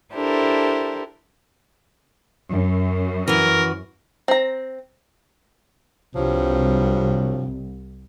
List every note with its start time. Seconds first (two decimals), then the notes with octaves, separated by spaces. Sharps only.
0.14 D4 E4 G4 A4 A#4 C5
2.50 F#2
3.28 E3 F#4 A#4
4.28 C4 A#5
6.15 C2 G2 F3 F#3